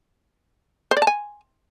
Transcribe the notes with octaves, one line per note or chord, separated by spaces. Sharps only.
C5
D5
A5
G#5